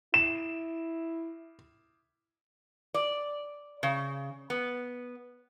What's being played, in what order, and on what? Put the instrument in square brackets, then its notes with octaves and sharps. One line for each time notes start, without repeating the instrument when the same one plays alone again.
[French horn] E4 [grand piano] E7
[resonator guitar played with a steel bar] D5
C#3
B3